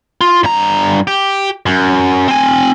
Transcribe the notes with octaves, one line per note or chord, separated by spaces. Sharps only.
F4
G2 A#5
G4
F#2
C4 G#5